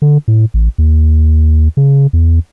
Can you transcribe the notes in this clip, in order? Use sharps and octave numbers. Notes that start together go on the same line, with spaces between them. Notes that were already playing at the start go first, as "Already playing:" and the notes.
D3
A2
A1
D#2
C#3
E2